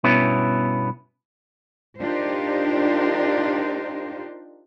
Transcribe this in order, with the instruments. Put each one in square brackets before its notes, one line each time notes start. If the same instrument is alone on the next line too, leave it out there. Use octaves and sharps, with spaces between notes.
[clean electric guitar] G2 B2 B3 C#4 E4
[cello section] D4 D#4 F4 G4 A#4 C5